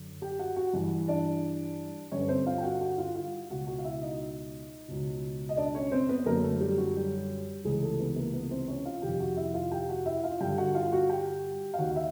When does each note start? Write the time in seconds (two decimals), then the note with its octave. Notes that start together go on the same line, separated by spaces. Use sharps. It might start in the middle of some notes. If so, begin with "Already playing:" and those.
Already playing: F#2 D3
0.22 G4 G5
0.39 F#4 F#5
0.56 F#4 F#5
0.73 G2 E3
1.08 D4 D5
2.12 G2 D3 C#4 C#5
2.20 B4
2.28 C4 C5
2.46 F4 F5
2.58 G5
2.63 F#4 F#5
2.81 F#4 F#5
2.98 F4 F5
3.15 F4 F5
3.50 C#2 B2 F#4 F#5
3.67 F#4 F#5
3.79 F5
3.84 E4 E5
4.02 D#4 D#5
4.88 C#2 B2
5.49 D#5
5.57 D4 D5
5.74 C#4 C#5
5.91 C4 C5
6.09 B3 B4
6.26 F#2 D3 A#3 A#4
6.43 A3 A4
6.60 G3 G4
6.78 F#3 F#4
6.96 G3 G4
7.64 C#2 C3 E3 G#3 G#4
7.81 A3 A4
7.99 B3 B4
8.16 A#3 A#4
8.33 B3 B4
8.51 C4 C5
8.68 C#4 C#5
8.85 F4 F5
9.02 F2 C3 D#3 G4 G5
9.20 F#4 F#5
9.37 E4 E5
9.54 F4 F5
9.71 G4 G5
9.89 F#4 F#5
10.06 E4 E5
10.23 F4 F5
10.41 G2 D3 G4 G5
10.58 F#4 F#5
10.75 F4 F5
10.92 F#4 F#5
11.09 G4 G5
11.74 F5
11.79 D#2 D#3 F#4 F#5
11.96 E5